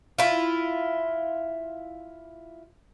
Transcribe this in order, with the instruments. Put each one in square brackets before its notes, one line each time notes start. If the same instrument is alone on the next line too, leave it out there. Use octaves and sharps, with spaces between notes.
[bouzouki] E4 F4